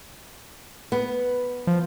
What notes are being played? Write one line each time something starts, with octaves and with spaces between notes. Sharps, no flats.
B3
F3